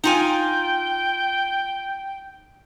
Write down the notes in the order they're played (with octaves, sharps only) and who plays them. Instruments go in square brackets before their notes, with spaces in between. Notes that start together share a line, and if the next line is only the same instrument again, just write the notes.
[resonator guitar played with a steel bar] D#4 F4 G#5 [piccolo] G5